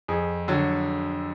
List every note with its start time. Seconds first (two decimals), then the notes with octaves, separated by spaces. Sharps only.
0.08 F2 G#4
0.48 D3 F#3